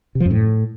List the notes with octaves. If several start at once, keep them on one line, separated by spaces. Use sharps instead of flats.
C3
F3
F#2
A2